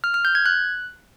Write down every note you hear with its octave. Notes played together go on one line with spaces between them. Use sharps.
F6
F6
G6
G#6
F#6